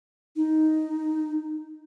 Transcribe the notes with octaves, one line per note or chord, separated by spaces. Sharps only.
D#4